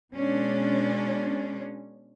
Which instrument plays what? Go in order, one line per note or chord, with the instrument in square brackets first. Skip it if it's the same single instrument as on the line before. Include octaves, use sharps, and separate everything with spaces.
[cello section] B2 G#3 C#4 D4